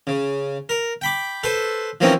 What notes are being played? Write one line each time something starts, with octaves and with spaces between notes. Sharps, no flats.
C#3
A#4
G5 B5 D6
A4 B4 C5
E3 F3 A#3 C4 C#4 D#4